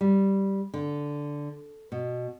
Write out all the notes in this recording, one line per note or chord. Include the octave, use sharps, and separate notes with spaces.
G3
D3
B2